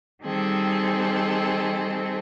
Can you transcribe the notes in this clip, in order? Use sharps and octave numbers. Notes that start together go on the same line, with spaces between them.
D#3 G3 C4 G#4 A4